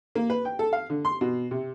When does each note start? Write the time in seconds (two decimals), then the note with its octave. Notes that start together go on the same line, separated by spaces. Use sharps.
0.15 A#3
0.30 B4
0.45 G5
0.59 A4
0.73 F5
0.90 D3
1.05 C6
1.21 B2
1.51 C3